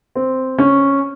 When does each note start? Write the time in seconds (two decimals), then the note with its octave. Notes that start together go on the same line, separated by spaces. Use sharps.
0.15 C4
0.58 C#4